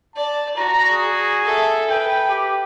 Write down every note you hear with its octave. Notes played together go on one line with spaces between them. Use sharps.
D5 A5
F#4 A#5
G#4
A4 E5
B4 G5
G4